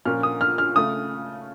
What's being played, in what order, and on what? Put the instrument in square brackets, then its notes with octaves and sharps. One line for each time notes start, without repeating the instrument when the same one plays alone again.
[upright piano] A#2 F3 A#3 C#4 F6
D#6
F6
F6
C#3 A3 D#6